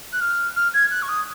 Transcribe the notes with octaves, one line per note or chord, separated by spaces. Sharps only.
F#6
F6
F6
G#6
F#6
C#6
D#6